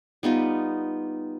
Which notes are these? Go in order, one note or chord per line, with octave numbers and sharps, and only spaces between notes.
G3 B3 D#4 F4